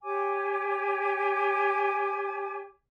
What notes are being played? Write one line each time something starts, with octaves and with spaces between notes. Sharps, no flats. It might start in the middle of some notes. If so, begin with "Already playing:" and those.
G4 C#5 G#5 D6